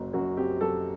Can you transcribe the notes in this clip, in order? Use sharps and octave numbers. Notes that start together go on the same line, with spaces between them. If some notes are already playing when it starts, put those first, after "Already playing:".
Already playing: F#1 F#2 F#3
F#2 F#4
C4 G4
F#3 A4